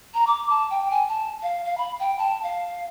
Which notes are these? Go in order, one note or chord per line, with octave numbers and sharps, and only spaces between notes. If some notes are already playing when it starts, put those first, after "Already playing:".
A#5
D6
A5
G5
G#5
A5
F5
F5
B5
G5
A5
F5